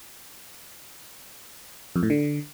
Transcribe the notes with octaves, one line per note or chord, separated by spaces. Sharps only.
F2
A2
D3